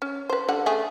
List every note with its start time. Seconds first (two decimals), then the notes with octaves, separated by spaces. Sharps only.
0.02 C#4
0.30 B4 C5
0.49 D3 G3 F#5
0.66 C#3 A3 G#4